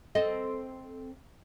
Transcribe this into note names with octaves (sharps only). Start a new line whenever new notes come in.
C4 A4 D#5